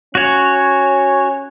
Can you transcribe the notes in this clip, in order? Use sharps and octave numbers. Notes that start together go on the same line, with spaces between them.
C#4 F#4 C#5